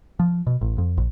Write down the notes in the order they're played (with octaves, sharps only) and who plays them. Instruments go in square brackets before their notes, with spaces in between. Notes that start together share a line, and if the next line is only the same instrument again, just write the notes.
[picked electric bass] F3
B2
A1
F2
A#1